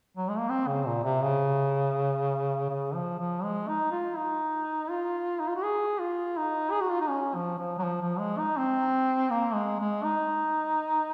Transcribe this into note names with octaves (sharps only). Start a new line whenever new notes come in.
F#3
G#3
A#3
C4
C#3
A#2
C3
C#3
C#3
F3
F3
G#3
D#4
F4
D#4
F4
D#4
F4
F#4
G#4
F4
D#4
G#4
F#4
F4
D#4
C#4
F3
F3
F#3
F3
F3
G#3
D#4
C4
A#3
G#3
G#3
D#4